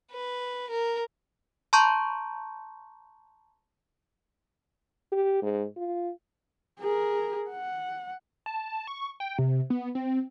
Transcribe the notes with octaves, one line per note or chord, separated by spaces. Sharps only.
B4
A#4
A5 A#5 C6 C#6 G6
G4
G#2
F4
G#4 A#4
F#5
A5
C#6
G5
C3
B3
C4